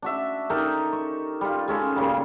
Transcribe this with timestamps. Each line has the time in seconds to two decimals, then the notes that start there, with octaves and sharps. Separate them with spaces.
0.02 D4 F#4 E5
0.50 D#4 G4 A4 A#4
0.93 C#6
1.41 G3 F4
1.68 G#3 C#4 A4
1.96 A#2 C#3 G3